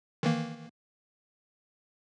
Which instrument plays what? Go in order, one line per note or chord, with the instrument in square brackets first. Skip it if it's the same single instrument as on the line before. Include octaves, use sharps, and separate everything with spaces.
[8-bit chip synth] D#3 E3 A#3